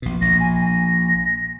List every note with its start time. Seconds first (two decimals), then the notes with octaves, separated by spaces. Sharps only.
0.02 A#1 B2
0.22 A#1 A#6
0.40 G#5
0.66 A#6